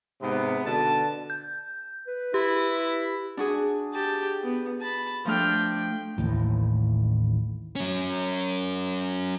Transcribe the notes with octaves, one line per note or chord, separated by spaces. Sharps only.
G#2 C3 B3
B2 D3 A5
G6
B4
E4 G4
D4 F#4 G#4
G4 A5
B3
A5 B5
F3 A3 D4 G5 F6
A1 D#2 A2
F#3 C#4